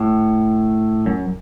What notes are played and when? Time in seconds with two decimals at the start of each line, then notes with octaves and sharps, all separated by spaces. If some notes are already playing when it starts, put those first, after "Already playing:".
Already playing: A2
1.06 F#2